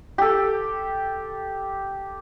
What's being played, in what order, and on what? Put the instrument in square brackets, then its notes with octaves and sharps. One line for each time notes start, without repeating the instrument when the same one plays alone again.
[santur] G4 A4